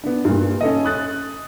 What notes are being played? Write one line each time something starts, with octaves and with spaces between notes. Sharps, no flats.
B3 D4
G2 A#2
C#4 A4 D#5
D#6 F#6 A6